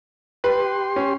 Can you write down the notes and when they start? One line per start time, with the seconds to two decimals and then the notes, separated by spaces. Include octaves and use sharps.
0.44 G4 B4 C6
0.96 C#4